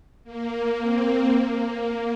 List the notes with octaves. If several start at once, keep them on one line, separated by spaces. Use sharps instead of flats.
A#3
C4
A#3